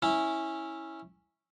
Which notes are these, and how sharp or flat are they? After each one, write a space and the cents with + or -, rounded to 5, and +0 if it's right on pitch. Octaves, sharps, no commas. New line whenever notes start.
C#4 -10 E4 -15